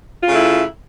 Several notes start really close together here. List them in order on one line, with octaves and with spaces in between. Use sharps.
F4 C#3 A3 E4